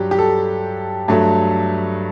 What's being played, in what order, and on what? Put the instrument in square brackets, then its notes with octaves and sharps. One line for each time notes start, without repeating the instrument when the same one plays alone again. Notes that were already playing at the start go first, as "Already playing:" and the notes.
Already playing: [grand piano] G2 F#3 G4
G4
A4
G2 F#3 A3